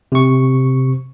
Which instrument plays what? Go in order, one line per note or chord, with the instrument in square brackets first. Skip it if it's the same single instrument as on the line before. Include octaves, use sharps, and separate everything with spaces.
[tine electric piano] C3 C#6